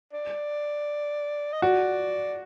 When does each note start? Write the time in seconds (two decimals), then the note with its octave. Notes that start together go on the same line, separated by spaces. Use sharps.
0.13 D5
1.53 D#5
1.62 F#4 D5